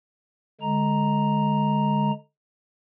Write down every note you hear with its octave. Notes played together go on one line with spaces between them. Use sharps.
D3 G#3 A#5